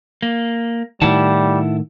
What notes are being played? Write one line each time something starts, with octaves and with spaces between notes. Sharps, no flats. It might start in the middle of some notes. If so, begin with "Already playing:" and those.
A#3
A2 D#3 G3 E4 F#5 A5